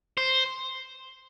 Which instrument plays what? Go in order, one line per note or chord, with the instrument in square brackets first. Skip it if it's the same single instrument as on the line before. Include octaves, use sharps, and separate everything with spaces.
[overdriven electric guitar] C5